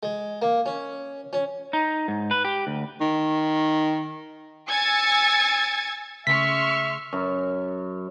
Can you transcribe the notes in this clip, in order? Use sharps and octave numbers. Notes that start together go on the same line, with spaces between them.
G#3
A#3
C#4
C#4
D#4
G#2
B4
G4
D2
D#3
G#5 E6 G#6 A6 C#7
C#3 A3 E5 C6 C#6 F6 B6
F#2